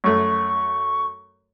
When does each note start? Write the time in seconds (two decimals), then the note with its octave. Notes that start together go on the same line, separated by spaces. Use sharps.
0.04 F#2 A3 C#6